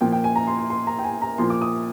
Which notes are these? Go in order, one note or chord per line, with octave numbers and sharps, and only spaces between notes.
A#2 F3 G5
G5
G#5
A#5
C6
C6
C6
A#5
G5
G#5
A#5
A#2 F3 C6
D6
D#6